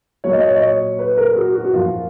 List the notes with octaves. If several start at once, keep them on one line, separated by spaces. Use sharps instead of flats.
A#2 F#3 A#3 C#5
D#5
C#5
D#5
C#5
B4
A#4
G#4
F#4
F#4
F#4
F#2 F3 A#3 F4